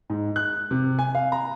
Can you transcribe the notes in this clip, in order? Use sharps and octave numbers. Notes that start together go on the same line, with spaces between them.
G#2
F#6
C3
G#5
F5
A#5